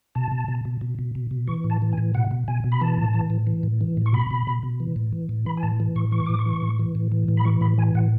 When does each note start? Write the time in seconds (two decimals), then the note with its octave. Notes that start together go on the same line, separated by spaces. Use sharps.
0.15 B2 A5
0.32 B2
0.48 B2
0.65 B2
0.81 B2
0.99 B2
1.15 B2
1.31 B2
1.48 E3 C#6
1.64 A2
1.70 A5
1.82 E3
1.93 G#5
1.98 A2
2.15 B2 F#5
2.31 B2
2.48 B2 G#5
2.64 B2
2.72 B5
2.81 E3 A5
2.97 A2
3.14 E3
3.30 A2
3.47 E3
3.63 A2
3.81 E3
3.97 A2
4.06 C#6
4.13 B2 B5
4.31 B2
4.47 B2
4.63 B2
4.80 E3
4.96 A2
5.13 E3
5.29 A2
5.46 E3 B5
5.57 G#5
5.63 A2 A5
5.80 E3
5.96 A2 C#6
6.12 E3 C#6
6.26 A2 D6
6.39 C#6
6.46 E3
6.62 A2
6.79 E3
6.95 A2
7.12 E3
7.28 A2
7.37 B5
7.45 E3 C#6
7.61 A2 B5
7.78 E3 G#5
7.95 A2 F#5